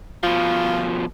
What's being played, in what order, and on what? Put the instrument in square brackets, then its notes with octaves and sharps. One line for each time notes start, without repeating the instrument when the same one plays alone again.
[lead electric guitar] B2 F3 [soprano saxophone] F4